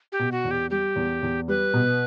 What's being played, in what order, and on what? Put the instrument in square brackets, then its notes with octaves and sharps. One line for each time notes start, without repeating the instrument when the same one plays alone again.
[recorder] G4
[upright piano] B2
[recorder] F#4
[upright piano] E2
[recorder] G4
[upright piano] G3 [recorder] G4
[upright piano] E2
E2
[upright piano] G3 [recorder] B4
[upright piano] B2